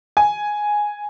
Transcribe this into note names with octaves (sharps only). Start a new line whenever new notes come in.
G#5